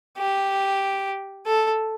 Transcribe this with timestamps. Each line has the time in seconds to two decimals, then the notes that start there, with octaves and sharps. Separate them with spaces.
0.18 G4
1.46 A4